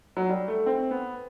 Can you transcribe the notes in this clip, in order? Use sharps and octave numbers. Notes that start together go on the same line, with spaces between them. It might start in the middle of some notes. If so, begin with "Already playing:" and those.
F#3
G3
A3
C4
B3